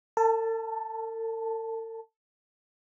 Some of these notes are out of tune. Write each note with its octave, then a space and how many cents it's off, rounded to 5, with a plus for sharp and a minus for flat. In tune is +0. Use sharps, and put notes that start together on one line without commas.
A4 +45 A5 +0